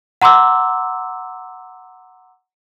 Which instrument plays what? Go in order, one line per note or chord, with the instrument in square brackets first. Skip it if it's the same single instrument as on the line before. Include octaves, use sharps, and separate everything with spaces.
[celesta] F#5 A#5 C6 D6 E6